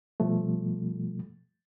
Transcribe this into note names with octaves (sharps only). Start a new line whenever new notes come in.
B2 F3 G3 A3